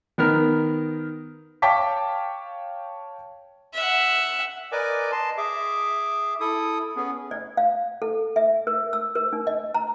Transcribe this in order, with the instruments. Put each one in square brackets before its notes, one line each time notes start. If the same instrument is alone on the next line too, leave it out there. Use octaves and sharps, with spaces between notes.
[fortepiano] D#3 B3 A#4 F6
[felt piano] C#5 F5 G5 A5 D6 B6
[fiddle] E5 F#5
[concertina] A#4 B4 D5 D#5 G#5 D6
D#5 A5 C6
G#4 E5 D6
E4 A4 D#6
B3 C#4 G#4
[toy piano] D5
F5
A4
E5
A#4
E6
A#4
D4
D#5
A#5